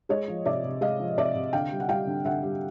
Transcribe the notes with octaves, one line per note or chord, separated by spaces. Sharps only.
G#3 C#5 D#5
F3
C3 D5 E5
C3
G#3 D#5 F5
F3
C3 D5 E5
C3
D3 F5 G5
G3
F#5
G3 F5 G5
D3
D3 E5 F#5
G3